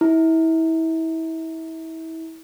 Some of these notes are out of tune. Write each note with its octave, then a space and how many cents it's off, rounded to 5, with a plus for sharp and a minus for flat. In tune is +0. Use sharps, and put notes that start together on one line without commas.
E4 -30